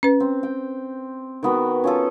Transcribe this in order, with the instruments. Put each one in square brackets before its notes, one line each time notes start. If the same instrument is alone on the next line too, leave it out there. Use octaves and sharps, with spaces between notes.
[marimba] C#4 B4
[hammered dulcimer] C4
G5
D#3 B3 F#4
C#4 F4 A4